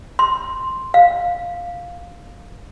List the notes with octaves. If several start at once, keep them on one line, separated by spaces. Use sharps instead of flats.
C6
F5